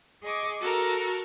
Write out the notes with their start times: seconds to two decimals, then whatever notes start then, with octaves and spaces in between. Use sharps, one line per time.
0.23 G#4 D#5 C#6 D6
0.60 F#4 A4 A#4